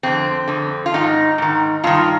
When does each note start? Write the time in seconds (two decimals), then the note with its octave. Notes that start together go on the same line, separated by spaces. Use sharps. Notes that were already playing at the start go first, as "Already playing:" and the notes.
0.03 F2 D3 C4
0.48 F2 D3
0.86 F4
0.94 G#2 D#3 D#4
1.38 G#2 D#3
1.84 G2 D#3 F4